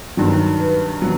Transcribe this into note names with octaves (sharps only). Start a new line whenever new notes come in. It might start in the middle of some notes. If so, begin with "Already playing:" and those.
G2 D#3 F#3
B4
F#3